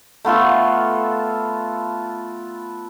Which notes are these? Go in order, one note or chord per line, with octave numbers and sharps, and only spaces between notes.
A3 B3 F4 A4